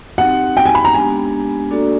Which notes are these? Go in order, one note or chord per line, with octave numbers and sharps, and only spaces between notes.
C4 D#4 G4 F#5
G5
G#5
B5
A#5
G#3 B3 D4 G4 G#5
A#3 D4 F#4 A4 D5